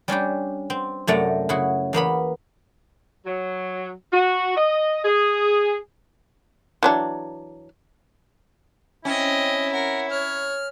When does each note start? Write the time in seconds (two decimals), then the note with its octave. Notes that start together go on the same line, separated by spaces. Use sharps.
0.08 G3 C#4 D4 G4
0.70 C4
1.07 F#2 C3 A3 D5 F#5 A#5
1.49 C#3 E4 F#4
1.93 E2 A#3 B3 B5
3.26 F#3
4.13 F#4
4.56 D#5
5.05 G#4
6.83 E3 F#3 D4
9.05 C4 C#4 E4 D#5 G5
9.73 A#4 F#5
10.10 C#5 F6